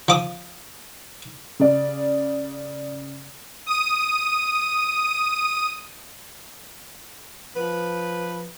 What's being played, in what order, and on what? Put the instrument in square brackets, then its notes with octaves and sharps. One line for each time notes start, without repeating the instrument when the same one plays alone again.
[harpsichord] F3 D6 D#6
[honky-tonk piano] C#3 D5
[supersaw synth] D#6 D#7
[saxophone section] F3 B4